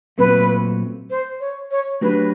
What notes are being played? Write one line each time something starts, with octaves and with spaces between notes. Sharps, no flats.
A#2 F#3 A3 C4 B4
C5
C#5
C#5
F#3 A3 D4 G4 B4